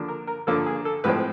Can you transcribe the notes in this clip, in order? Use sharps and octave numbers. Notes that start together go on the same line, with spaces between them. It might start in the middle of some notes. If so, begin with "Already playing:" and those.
Already playing: D3 F3 A#3 D4
A#4
A#4
D3 F3 A#3 D4 A4
G#4
A4
A2 F3 G#3 C4 B4